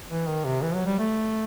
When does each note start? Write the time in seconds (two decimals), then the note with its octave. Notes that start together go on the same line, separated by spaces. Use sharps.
0.09 E3
0.27 D#3
0.44 C3
0.62 E3
0.74 F#3
0.86 G3
0.98 A3